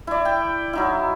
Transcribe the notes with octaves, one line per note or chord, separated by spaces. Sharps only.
E4 D5
G5
F#3 D#4 E4